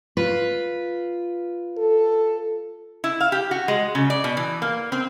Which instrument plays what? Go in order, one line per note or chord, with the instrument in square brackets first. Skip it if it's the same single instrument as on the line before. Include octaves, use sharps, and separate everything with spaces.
[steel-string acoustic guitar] F4 B4
[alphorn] A4
[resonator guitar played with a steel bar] E4
F5
G4
F#4
G#3
C#3
D5
B2
E3
A#3
C4